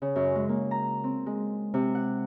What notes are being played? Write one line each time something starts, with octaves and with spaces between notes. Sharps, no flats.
C#3
F#2
G#3
A#3
A#5
C4
G#3
C3
F#5